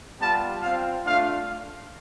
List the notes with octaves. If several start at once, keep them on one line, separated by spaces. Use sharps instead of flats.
G3 B3 F4 A5
C4 F4 F5
A3 D4 F4 F5